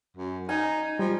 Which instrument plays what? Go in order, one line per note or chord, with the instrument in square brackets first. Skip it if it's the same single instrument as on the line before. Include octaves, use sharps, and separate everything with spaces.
[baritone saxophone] F#2
[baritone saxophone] D#4 [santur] G#5 A#5
[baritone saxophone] F3 [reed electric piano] G3